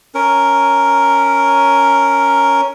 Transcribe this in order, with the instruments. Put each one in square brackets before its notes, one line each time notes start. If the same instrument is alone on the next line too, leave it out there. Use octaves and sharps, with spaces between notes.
[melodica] C#4 A#4